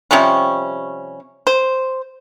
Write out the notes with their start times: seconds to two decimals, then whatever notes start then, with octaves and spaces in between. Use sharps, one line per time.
0.11 C3 F3 G3 C#4
1.47 C5